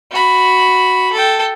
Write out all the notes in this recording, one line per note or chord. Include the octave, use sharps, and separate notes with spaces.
F#4 B5
A4 G5